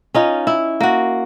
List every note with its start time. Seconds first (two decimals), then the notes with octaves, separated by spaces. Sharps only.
0.14 C#4 D#4 F4
0.47 E4
0.80 A#3 F#4